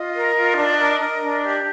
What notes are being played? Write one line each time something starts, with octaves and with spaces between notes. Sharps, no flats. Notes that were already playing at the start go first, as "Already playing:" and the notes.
Already playing: F4 D#5
A#4
F4
D4
A#4
A#4
D4
G4